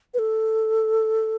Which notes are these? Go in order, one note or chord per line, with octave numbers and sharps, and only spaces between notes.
B4
A4